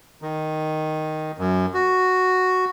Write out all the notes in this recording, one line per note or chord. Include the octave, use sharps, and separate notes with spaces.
D#3
F#2
F#4